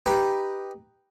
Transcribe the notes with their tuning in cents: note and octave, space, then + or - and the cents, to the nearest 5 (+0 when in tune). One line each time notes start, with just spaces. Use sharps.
D#4 +0 G4 +0 B4 +0